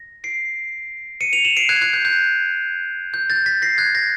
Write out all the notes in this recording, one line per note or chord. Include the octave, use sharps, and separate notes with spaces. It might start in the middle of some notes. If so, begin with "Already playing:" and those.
Already playing: A#6
C7 D7
C#7 D#7
D#7 F7
E7 F#7
C7 D7
F#6 G#6
F#6 G#6
G6
G6
G6
G6 A6
A6 B6
A#6 C7
F#6 G#6
G#6 A#6